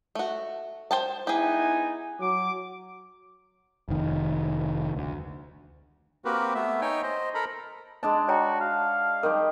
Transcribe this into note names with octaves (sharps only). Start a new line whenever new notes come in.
A3 F#4
C5 G5 A5
B3 D#4 E4 G4 G#4 G#5
F#3 D6
F1 D#3
D2
A#3 C4 F#4 G4 A#4 B4
A3 B3 E5
D#4 C#5 G5 G#5
C5 D#5
A4 A#4 A#5 B5
G#3 D4 A5
F#4 C#5 G5 A#5
F5
D#3 G3 G4 A#4